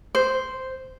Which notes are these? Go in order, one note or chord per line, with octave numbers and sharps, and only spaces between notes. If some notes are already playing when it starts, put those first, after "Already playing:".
C5